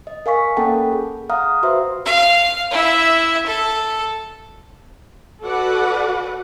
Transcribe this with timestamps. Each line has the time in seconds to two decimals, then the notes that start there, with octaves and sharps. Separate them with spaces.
0.07 D#5
0.26 A#4 F5 G#5 C#6 B6
0.57 A#3 C#4 A4 F#5 G5 A5
0.92 G#4
1.30 F5 F#5 A#5 D#6 F6
1.63 F#4 B4 C5 E5 C6
2.05 F5
2.71 E4 E5
3.47 A4
5.44 F#4 A4 B4 D5 F#5